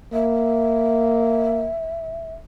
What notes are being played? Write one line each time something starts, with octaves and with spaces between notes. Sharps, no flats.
A#3 E5